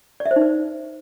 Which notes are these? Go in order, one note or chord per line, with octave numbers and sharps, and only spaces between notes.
D5
E5
C5
D#4
B4